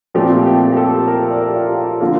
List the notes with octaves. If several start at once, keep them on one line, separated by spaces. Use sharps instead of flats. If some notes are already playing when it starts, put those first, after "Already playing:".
A#2 F3 A3 C4 G4
G4
G4
A4
A#4
D5
G4
F4
G4
F4
D3 F3 A#3 F4